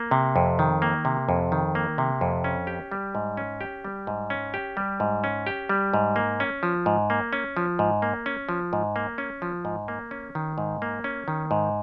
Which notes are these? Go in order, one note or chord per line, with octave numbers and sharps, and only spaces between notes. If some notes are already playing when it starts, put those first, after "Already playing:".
Already playing: A#3
C3
F2
D#3
A#3
C3
F2
D#3
A#3
C3
F2
C#4
G4
G3
G#2
C#4
G4
G3
G#2
C#4
G4
G3
G#2
C#4
G4
G3
G#2
A#3
C#4
F3
G#2
A#3
C#4
F3
G#2
A#3
C#4
F3
G#2
A#3
C#4
F3
G#2
A#3
C#4
D#3
G#2
A#3
C#4
D#3
G#2